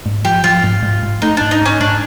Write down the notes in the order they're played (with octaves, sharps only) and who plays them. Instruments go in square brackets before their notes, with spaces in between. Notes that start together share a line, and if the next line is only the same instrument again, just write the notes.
[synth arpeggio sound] G#2
[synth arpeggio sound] F3 [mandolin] G4
[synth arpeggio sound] F3 [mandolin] F4
[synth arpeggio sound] G#2
G#2
G#2
[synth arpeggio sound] A3 [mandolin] D#4
[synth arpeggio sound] G#2 [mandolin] D4
[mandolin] D#4
[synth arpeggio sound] G#2 [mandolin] C#4
[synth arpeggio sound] G#2 [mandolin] D4